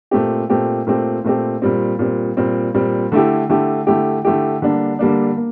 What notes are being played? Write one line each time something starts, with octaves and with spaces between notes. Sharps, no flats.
A#2 A3 C4 G4
A#2 A3 C4 G4
A#2 A3 C4 G4
A#2 A3 C4 G4
A#2 G3 C4
A#2 G3 C4
A#2 G3 C4
A#2 G3 C4
D3 A3 E4 G4
D3 A3 E4 G4
D3 A3 E4 G4
D3 A3 E4 G4
D3 G3 A#3 D4
D3 G3 A#3 D4
A#3